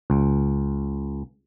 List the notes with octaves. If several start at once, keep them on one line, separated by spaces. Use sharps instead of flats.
C#2